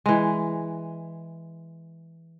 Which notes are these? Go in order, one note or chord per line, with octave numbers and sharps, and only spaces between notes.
E3 G#3